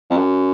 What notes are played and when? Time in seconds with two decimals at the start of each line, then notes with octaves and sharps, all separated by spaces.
0.11 F2
0.17 F#2